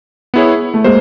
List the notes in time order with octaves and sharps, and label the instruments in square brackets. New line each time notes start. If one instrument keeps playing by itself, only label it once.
[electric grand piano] B3 E4 G#4 C#5
[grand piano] A3
[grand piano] G#3 A#3 [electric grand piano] C5